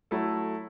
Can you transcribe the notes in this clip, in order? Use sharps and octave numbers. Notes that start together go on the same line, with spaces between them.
F#3 A3 E4 A4